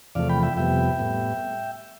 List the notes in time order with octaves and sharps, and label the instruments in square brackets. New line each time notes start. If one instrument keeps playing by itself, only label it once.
[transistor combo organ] E2 C3 F3 A3 D5 F5
G5 B5
E5 G5
F2 C3 G3 B3 E5 G5
A2 G3 B3